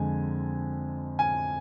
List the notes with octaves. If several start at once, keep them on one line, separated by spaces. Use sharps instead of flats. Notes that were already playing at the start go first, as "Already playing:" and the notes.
Already playing: F2 D3 G#3 G#5
G#5